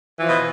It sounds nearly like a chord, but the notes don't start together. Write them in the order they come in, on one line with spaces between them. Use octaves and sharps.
E3 F3 B2